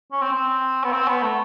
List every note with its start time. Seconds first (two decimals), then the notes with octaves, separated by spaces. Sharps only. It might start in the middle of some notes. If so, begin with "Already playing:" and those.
0.12 C#4
0.22 C4
0.32 C4
0.84 B3
0.92 C4
1.08 B3
1.23 A3